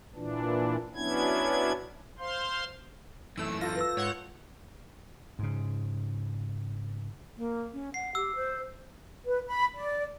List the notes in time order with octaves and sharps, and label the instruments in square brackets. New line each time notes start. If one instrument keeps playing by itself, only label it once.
[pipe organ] A#2 E3 D4
F#3 B3 C#4 D4 E4 G#6
C5 F5 C6
[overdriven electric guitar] F#2 E3 [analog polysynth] A3 E6
[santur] F4 A4 C5 [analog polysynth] A#6
[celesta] B4 E6
[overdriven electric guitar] G#2 [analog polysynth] C#5 F#5 G6
[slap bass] G#2 C#3
[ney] A#3
C#4
[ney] F#5 [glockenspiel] C7
[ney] G4 [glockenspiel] E6
[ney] C5
[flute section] B4
B5
D5